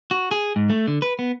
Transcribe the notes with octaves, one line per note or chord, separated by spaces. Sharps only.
F#4
G#4
G#2
A3
D3
B4
B3